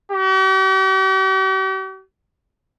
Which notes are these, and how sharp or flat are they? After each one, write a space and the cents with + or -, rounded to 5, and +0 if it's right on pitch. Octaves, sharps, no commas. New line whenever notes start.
G4 -45